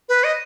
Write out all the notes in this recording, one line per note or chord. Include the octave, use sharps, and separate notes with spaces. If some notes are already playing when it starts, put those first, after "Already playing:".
B4
D#5